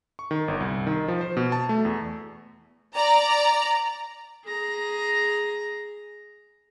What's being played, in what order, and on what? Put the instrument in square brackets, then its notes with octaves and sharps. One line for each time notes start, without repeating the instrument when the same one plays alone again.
[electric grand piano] C#6
D#3
G1
C2
D#3
F3
C5
B2
A5
A3
E2
[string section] D5 A#5
[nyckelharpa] G#4 A#5